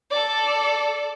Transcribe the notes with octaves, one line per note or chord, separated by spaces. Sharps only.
A4 D5